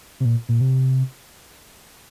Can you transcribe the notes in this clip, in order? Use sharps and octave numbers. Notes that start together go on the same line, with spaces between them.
C3
A#2
A#2
C3